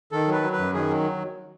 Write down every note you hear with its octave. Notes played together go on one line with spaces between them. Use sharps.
D#3 A4
F#3 B4
F#3
B4
F#2
D#3 G#4
F#3